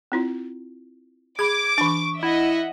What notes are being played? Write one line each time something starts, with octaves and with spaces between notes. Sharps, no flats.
C4 E4 F4
G#4 B5 D6 G#6
E3 D4 C#6
E4 D#5 E5 F#5